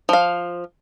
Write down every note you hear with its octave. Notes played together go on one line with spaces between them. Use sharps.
F3 F5